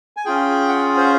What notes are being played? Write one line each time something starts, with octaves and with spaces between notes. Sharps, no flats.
G#5
C#4 F4 G#4 G5
F#5
C5